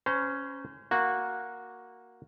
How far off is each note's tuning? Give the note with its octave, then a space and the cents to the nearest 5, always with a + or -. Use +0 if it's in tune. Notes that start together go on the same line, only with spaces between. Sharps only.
C#4 +0 C5 -30 A#5 +0
A#3 +0 F#4 -10